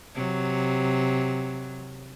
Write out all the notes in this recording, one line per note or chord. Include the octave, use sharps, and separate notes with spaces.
C3 F#3